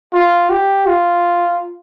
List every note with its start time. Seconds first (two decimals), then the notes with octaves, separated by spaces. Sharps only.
0.13 F4
0.50 G4
0.86 F4